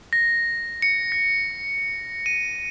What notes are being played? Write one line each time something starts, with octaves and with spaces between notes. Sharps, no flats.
A#6
C#7
A#6
D#7